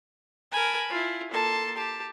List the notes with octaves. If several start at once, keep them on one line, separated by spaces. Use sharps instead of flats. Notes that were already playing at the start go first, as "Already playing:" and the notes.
A#4 G#5 A5 B5
E4 F4
A#3 A4 A5 C6
G4 A5